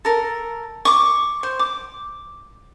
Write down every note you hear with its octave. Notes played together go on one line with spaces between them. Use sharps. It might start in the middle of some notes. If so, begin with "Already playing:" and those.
A4 A#4
C#6 D6
C5
D6